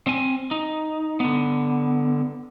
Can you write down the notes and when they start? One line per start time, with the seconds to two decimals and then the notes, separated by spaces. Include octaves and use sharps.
0.07 C4 G#5
0.51 D#4
1.20 D3 B3